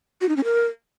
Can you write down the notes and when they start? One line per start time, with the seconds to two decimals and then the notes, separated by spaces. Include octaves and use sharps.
0.21 F#4
0.29 D#4
0.37 C#4
0.44 A#4